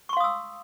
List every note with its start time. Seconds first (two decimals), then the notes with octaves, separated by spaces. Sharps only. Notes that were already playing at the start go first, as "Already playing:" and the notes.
0.09 C#6
0.13 C6
0.17 F5
0.20 D#6
0.24 E6